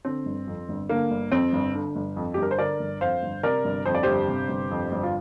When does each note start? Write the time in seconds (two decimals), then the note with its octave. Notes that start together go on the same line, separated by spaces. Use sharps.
0.05 D3 C4
0.26 G1
0.47 F2
0.69 G1
0.89 D3 A#3
1.11 G1
1.32 F2 C4
1.53 G1
1.74 D3
1.96 G1
2.17 F2
2.34 G4
2.38 G1 A#4
2.51 C5
2.59 D3 A#4 D5
2.80 G1
3.01 F2 C5 F5
3.23 G1
3.43 C3 A#4 D5
3.65 G1
3.86 F2 C5
3.95 D5
4.03 G1 G4 C5
4.28 C3
4.49 G1
4.71 F2
4.92 G1
5.03 F4